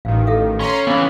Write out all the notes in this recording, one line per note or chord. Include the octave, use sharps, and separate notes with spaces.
A1 D#3 F5
A4 E5 F5
C#4 A#5 C6
C#2 E3 B3 C#4 F5